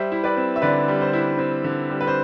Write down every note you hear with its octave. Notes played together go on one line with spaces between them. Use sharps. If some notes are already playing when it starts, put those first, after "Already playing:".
Already playing: G3 C5 E5
E4
B4 D5
C4
E5
D3 B4 D5
G3
C5
E4
C4
D3
G3
B4
C5